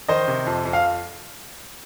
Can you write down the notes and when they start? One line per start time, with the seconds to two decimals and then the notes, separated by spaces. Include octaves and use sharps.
0.08 D#3 C5 D#5
0.28 C3
0.47 F2
0.65 F2
0.73 F5